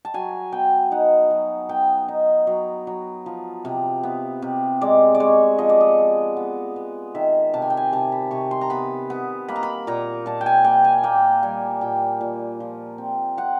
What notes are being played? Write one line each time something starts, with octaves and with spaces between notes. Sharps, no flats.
A5
F#3 G#5
B3 G5
D#4 F#5
F#3
B3 G5
D#4
F#3
F#3
F3
C3
B3
C3
G#3 D5
D5
G#3 C#5
F3 D#5
D5
D#5
B3
B3
B3
D#3 E5
C3 A5
G#5
G5
G#5
C3 A5
B5
C3 C#6
C6
A#5
B3 B5
B3
A#3 B5
A#5
B5
A#2 A#5
A#2 A5
G5
G#5
A#3 G5
G#5
A#3 G5
G3 G#5
A#2 G5
A#2
F3
C4
C4 F#5